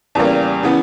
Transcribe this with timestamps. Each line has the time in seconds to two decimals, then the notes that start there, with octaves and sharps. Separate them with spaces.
0.15 E2 C#3 G3 A#3
0.63 C#3 E3 B3